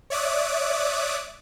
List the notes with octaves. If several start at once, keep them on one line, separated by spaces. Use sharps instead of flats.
C#5 D5 E5 D6 D#6 F#6